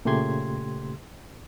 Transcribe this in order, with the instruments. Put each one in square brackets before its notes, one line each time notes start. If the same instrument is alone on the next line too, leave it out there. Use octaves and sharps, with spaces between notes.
[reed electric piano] A#2 C#3 A3 G4 C6 G#6